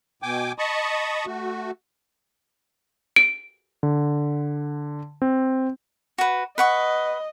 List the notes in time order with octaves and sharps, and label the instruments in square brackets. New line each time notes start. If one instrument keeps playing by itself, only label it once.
[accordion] B2 G5 G#5 D6
D#5 A5 B5 C#6 D#6
A3 F#4
[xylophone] D7
[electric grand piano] D3
C4
[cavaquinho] F#4 B4
[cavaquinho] B4 F#5 C#6 [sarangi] D#5